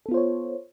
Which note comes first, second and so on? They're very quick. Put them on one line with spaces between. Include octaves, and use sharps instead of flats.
A4 B3 F4 C5 C#5